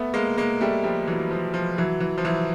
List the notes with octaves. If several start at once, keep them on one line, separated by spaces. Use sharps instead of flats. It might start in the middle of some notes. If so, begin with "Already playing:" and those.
Already playing: A3 B3
G#3 A#3
G#3 A#3
G3 A3
F3 G3
E3 F#3
F3
F3
E3 F#3
E3
F3
E3 F#3